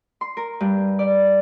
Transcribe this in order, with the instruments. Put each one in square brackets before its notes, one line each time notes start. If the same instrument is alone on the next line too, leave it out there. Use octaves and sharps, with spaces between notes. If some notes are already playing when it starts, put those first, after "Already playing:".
[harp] C6
A#4
G2
D5